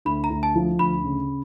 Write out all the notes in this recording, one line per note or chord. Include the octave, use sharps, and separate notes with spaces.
D2 B5
A#5
D2
A5
F3
D2 B5
C#3